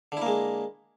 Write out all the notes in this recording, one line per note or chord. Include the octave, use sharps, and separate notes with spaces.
D3 G#3 A#3 E4